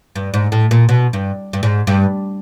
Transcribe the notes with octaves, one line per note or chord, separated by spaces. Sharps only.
G2
G#2
A2
A#2
B2
G2
G2
G#2
G2